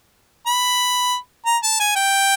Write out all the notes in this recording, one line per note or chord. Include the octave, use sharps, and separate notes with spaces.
B5
A#5
A5
G#5
G5